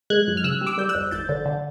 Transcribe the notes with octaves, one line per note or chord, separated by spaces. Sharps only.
G#3 F#6 G#6
F#2
F6
C#3 E6 F#6
G3
D6 E6
G3 G6
E6 F#6
F2
G#1 G6 A6
D3
D3